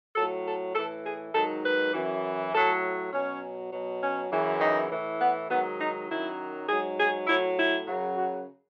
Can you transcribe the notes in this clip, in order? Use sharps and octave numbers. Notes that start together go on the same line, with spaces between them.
A2 F#3 A4
A4
A2 E3 A4
G#4
G#2 D#3 F#3 A4
B4
F#2 E3
A2 F#3 A4
B2 F#3 C#4
B2 F#3
C#4
F#2 C#3 E3
D#4
A2 E3
B3
G#2 D#3 F#3 B3
D#4
F#2 D#3 F#3 E4
G#2 F#3 G#4
G#4
A2 F#3 E4
E4
F#2 C#3 F#3
F#4